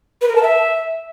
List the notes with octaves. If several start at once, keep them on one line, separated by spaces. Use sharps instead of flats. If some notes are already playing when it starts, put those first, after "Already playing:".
B4
A#4
A5
E5